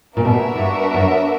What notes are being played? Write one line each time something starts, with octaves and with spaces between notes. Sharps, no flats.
A#2 B3 D4 F#4 A#4 E5
B2
A#2
G2
F#2